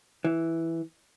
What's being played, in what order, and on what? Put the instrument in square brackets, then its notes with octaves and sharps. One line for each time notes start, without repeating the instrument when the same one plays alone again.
[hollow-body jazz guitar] E3